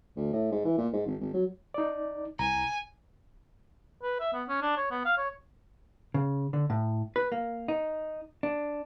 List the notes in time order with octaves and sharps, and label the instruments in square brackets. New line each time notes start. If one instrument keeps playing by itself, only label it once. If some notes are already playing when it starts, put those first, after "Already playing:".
[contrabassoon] D2
A2
G#2
E3
A#2
G#2
G#1
G#1
F#3
[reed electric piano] D#4 D5
[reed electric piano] C2 A#5 [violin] G#5
[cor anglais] B4
E5
B3
C#4
D4
C#5
B3
F5
C#5
[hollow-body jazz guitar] C#3
D3
A2
B4
A#3
D#4
D4